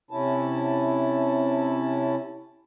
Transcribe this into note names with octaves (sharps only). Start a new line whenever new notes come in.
C3 C#4 E4 A5